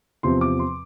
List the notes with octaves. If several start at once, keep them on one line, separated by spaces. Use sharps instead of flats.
E2 C3 F3 C4 C6
D6
C6